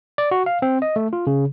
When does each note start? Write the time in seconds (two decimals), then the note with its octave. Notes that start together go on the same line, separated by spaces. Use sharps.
0.18 D5
0.31 F#4
0.46 F5
0.62 C4
0.82 D#5
0.96 A3
1.13 F4
1.27 C#3